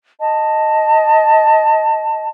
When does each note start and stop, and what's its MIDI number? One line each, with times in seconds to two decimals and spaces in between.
0.20 2.28 75
0.20 2.28 81